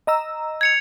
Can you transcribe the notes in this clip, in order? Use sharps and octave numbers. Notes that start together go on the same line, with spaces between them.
D#5 A#5 E6
G#6 C#7 F7